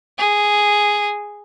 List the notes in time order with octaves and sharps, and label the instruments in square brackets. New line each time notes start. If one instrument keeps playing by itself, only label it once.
[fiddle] G#4